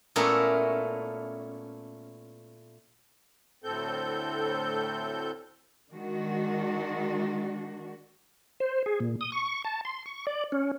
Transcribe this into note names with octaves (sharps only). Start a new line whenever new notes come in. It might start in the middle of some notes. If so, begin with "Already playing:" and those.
A#2 A3 B3 C#4 E4 A#4
D2 A2 C4 A4 G6
D#3 G#3 D4 F#4
C5
G#4
A#2
D#6
C#6
A5
C6
C#6
D5
C#4